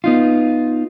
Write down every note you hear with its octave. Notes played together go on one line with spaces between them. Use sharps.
B3 D#4 F4